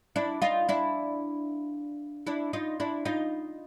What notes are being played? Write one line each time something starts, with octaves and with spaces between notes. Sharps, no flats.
D4 E4
D#4 F4
D4 E4
D4 E4
D#4 F4
D4 E4
D#4 F4